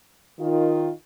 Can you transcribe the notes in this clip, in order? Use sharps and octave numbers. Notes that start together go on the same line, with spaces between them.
D#3 F4